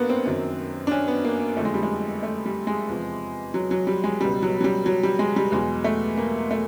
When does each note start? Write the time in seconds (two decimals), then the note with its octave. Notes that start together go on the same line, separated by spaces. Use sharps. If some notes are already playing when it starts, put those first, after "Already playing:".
Already playing: G2 A#3 B3
0.09 C4
0.25 F#2 D#3 F#3
0.87 D4
0.92 C#4
1.08 B3
1.24 A#3
1.57 F2 D3 F3 A3
1.65 G#3
1.74 G3
1.83 G#3
2.23 A3
2.45 G3
2.67 G#3
2.89 E2 C3 F3
3.54 F#3
3.71 F#3
3.87 G3
4.04 G#3
4.21 C#2 B2 F#3 G3
4.42 F#3
4.60 F#3
4.64 G3
4.86 F#3
5.03 G3
5.19 G#3
5.36 G3
5.52 E2 B2 F#3 G#3
5.84 A3
6.17 A#3
6.51 A3